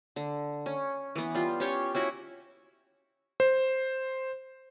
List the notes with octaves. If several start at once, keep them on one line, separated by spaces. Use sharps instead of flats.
D3
C#4
E3 B3
G3 F4
C#4 G4 C#5
C#4 E4 F#4
C5